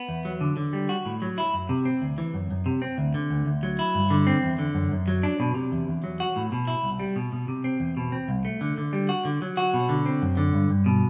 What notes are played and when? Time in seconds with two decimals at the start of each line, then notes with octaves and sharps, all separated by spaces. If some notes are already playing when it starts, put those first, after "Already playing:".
Already playing: B3
0.09 E2
0.25 F#3
0.41 D3
0.57 D3
0.73 G3
0.89 F#4
1.05 A2
1.22 F#3
1.38 E4
1.54 F#2
1.69 C3
1.85 C4
2.02 D2
2.18 E3
2.34 F#2
2.51 F#2
2.66 C3
2.82 C4
2.98 D2
3.14 D3
3.30 D2
3.46 D2
3.63 F#3
3.79 E4
3.95 G2
4.10 D3
4.27 C4
4.43 E2
4.59 D3
4.75 F#2
4.91 F#2
5.08 F#3
5.23 D4
5.40 B2
5.55 C3
5.72 E2
5.88 E2
6.04 F#3
6.20 F#4
6.36 A2
6.52 B2
6.67 E4
6.83 C2
6.99 G3
7.16 B2
7.33 B2
7.48 C3
7.64 C4
7.80 E2
7.97 B2
8.12 C4
8.29 C2
8.45 A3
8.61 D3
8.77 D3
8.93 G3
9.09 F#4
9.25 D3
9.42 F#3
9.57 F#4
9.74 B2
9.89 D3
10.06 C4
10.22 F#2
10.37 D3
10.54 G2
10.70 G2
10.86 B2